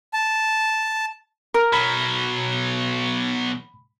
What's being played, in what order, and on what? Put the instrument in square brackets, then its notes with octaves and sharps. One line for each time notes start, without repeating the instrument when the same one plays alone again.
[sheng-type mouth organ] A5
[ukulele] A#4
[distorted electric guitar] B2 F#3 [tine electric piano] B5